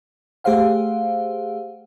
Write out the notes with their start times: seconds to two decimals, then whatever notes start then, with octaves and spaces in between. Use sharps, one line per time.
0.44 A3 G4 G#4 C5 F5 F#5